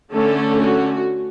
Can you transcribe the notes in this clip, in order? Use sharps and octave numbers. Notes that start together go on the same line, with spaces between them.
D3 A3 C#4 A4
F#4